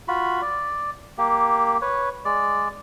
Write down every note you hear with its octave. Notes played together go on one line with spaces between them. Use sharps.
F4 F#4 B5
D5
A#3 G4
B4 C#5
G#3 D5